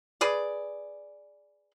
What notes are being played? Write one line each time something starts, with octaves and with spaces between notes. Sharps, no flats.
G#4 B4 D5